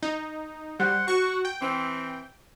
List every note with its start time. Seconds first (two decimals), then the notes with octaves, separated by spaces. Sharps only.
0.03 D#4
0.80 G3 C5 F#5
1.08 F#4 C#6
1.45 G5
1.61 E3 C4